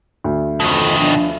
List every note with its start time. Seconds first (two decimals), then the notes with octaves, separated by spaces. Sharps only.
0.24 D2
0.60 F2 B2 D#3
0.98 F3 D4